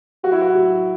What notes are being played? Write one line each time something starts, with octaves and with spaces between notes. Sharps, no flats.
F#3 F#4
E4
F#4
F#3